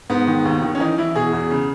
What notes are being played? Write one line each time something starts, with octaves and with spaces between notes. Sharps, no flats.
G#2 B3
D#3
D#2
D#3
C#4
E3 D#4
E3 E4
B2 G#4
E2
C#3